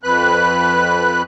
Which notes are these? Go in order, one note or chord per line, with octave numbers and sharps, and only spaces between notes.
F2 B4 F#6